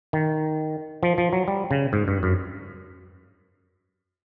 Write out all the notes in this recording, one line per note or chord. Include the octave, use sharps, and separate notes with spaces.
D#3
F3
F3
F#3
G3
C#3
G#2
G2
F#2